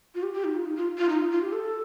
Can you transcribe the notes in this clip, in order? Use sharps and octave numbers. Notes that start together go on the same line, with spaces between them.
F4
G4
G4
D#4
F4
D#4
F4
F4
D#4
F4
F4
G4
A4